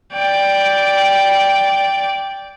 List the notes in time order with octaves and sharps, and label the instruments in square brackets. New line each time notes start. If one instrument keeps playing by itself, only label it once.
[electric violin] D5 G5